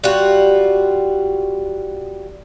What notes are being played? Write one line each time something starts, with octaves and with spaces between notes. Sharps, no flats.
G3 F4 F#4